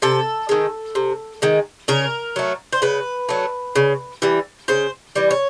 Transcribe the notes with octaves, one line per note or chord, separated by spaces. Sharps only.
C3 A4
D#3 G#3
C3
D#3 G#3
C#3 A#4
F#3 A3
C5
C#3 B4
F#3 A3
C#3
E3 G3
C#3 C5
E3 G3
C#5